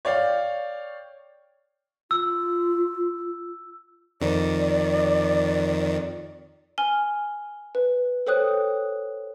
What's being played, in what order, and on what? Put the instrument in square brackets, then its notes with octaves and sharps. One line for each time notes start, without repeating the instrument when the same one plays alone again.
[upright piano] C#5 D5 F5 G5
[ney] F4 [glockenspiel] E6
[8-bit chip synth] F2 D#3 [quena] D5
[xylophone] G#5 F6 G7
B4
A4 C5 C#5 G5 D#6 F#6